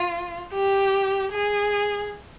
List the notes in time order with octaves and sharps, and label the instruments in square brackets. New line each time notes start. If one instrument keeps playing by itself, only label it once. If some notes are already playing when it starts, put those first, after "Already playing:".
Already playing: [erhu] F4
G4
G#4